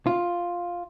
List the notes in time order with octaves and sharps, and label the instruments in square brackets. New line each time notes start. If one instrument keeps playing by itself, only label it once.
[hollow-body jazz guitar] F4